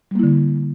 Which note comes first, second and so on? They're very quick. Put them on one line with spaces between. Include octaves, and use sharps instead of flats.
G3 A#3 E4 D3